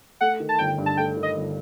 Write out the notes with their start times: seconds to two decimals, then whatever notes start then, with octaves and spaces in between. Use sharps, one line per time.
0.21 A3 F#5
0.40 D#3
0.49 A5
0.59 G1 G5
0.78 G2
0.86 A5
0.97 A3 G5
1.17 D#3
1.23 D#5
1.36 G1